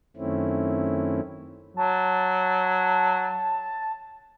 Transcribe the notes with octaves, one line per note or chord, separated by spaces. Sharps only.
F#2 D#3 A3 C4 C#4 E4
F#3 A5